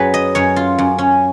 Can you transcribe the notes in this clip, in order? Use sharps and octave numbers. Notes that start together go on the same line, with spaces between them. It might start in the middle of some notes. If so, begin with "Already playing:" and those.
Already playing: F#2 F#3 G#4 B4
D#5
F#2 C#5
F4
F#2
C#4